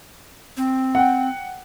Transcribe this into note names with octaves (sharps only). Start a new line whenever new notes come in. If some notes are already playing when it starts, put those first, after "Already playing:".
C4
F#5 G5